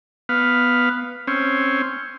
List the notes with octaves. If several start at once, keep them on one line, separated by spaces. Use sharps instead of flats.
B3 F5
C4 C#4